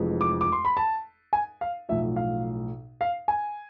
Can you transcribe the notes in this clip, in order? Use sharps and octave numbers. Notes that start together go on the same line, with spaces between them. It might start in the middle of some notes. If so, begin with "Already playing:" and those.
Already playing: F1 F2 E3 G#3
D6
D6
C6
B5
A5
G#5
F5
B1 A2 F3 E5
F5
F5
G#5